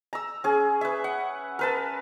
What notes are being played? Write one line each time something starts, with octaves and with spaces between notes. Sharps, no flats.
A#5 E6
C#4 G#4
B4 E5
F#5
A#4 B4 A5